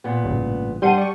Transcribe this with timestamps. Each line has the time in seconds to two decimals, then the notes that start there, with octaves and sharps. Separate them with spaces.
0.04 A#2 B3
0.24 A1 G2 C#3
0.82 G2 G3 F#5 A5 C6 D#7
0.98 D5 C#6